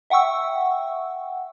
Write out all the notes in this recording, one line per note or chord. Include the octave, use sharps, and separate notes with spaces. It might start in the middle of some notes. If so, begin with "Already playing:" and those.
E5 F#5 G5 C#6 E6